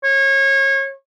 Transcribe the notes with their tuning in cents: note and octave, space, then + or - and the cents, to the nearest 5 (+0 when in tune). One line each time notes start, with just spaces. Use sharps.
C#5 -30